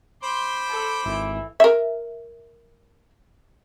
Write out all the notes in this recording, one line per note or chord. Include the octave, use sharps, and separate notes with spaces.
C5 B5 C6 D6
A4
G#1 E3
A#4 E5